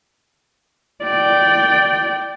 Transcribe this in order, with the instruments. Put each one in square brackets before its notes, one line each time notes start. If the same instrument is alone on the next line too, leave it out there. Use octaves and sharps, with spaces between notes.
[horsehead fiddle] D5 G5